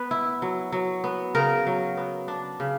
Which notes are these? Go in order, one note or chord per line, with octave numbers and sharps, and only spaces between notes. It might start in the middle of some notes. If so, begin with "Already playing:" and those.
Already playing: B3 B4
E4
F#3
F#3
B3
C#3 A#4
F#3
B3
D4
C#3